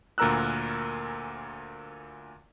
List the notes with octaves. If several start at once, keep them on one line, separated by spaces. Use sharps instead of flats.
D2 A#2 A#4 A#5 E6 F#6